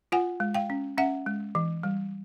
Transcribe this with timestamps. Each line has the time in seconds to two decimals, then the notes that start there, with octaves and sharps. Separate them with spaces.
0.12 F4 F#5 G#5
0.40 G#3
0.55 F5 G5
0.70 C#4
0.98 C#4 E5 F#5
1.26 G#3
1.55 E3
1.83 G3